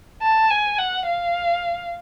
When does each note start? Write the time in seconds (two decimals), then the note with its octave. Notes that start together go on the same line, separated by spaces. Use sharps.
0.22 A5
0.50 G#5
0.78 F#5
1.06 F5